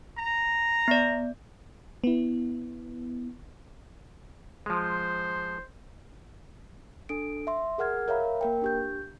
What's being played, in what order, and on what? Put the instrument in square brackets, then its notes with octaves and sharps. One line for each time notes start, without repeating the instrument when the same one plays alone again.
[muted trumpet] A#5
[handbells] B3 D5
[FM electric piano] B3 E4
[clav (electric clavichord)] F3 G#3 [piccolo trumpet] C5
[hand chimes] D4 A4 D7
E5 C6
G#4 A#4 F#5 F6 G#6
A#4 C#5 E5 F5 A#5 B5
A#3 A#4 G5
D4 G4 G6